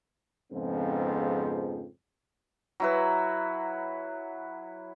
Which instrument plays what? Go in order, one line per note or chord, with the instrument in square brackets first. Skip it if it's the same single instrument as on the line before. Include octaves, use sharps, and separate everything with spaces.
[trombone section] F2 G#2 C#3 F3 B3 C4
[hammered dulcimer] F#3 E4 B4